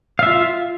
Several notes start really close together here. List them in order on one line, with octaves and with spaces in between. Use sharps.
F5 E5 F4